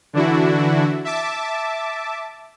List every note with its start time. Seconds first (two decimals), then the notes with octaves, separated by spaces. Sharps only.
0.13 D3 E3 D4 E4 F#4
1.05 E5 A5 D6